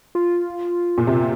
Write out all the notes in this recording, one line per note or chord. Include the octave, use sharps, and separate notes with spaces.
F4
A#2
C3